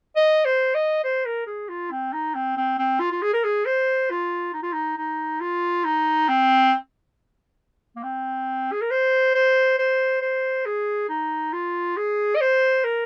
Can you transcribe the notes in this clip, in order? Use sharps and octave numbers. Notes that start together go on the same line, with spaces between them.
D#5
C5
D#5
C5
A#4
G#4
F4
C4
D#4
C4
C4
C4
F4
F4
G#4
A#4
G#4
C5
F4
D#4
F4
D#4
D#4
F4
D#4
C4
A#3
C4
G#4
A#4
C5
C5
C5
C5
G#4
D#4
F4
G#4
D#5
C5
A#4